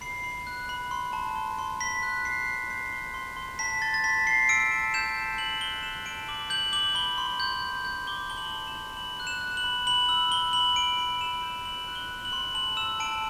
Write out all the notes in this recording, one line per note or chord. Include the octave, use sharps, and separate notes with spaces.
B5 C7
B5
F#6
B5
C6
A5
C6
C6
C6 B6
F#6
F#6 C7
F#6
G6 C7
C6
C6
C6
A5 B6
C6 A6
A6
A5 B6
C6 C7
E6 D7
A5
G6 E7
A5
A5 F#7
F#6 G7
F#6 E7
A5 D7
D6 F#7
G6 F#7
D6 F#7
B5 G7
C6
G6
G6
G6
D6 G7
A5 G7
F#7
A5
E7
G6
B5 F#7
F#6
E7
F#6
F#7
B5
B5 F#7
E6 F#7
B5 G7
B5 F#7
B5 D7
B5
B5 E7
G6
C6 F#7
F#6
G7
F#6
F#7
C6
A5 F#7
E6 E7
A5 D7